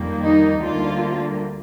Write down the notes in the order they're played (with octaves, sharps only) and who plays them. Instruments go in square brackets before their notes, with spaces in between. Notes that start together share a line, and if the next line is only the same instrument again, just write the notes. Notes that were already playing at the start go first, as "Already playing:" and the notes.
Already playing: [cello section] F2 D#3 G3 A#3
D#4
D2 D3 G3 A#3 F4